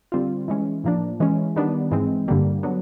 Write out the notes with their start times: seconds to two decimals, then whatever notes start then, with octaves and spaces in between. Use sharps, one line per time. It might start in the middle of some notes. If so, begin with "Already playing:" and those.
0.12 D3 G3 C4 F4
0.48 E3 G#3 C#4
0.84 A2 F3 A#3 D4
1.20 E3 G#3 C#4
1.56 D#3 G3 B3 D4
1.91 G#2 E3 G#3 C4
2.28 G2 D3 G3 A#3
2.63 D3 F#3 B3